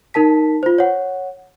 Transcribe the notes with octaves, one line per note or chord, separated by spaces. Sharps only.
D#4 A#4 A5 B6
F4 C5
C#5 F#5